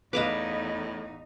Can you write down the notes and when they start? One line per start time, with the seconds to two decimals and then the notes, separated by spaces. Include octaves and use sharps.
0.13 E2 A2 D#4 B4 D#5 F5 D6 E7